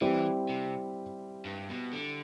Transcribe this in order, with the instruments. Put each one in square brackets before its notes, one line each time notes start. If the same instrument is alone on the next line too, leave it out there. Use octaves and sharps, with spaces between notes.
[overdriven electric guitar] E3 [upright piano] G3 C4 E4 G4
[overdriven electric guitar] C3
G2
B2
D3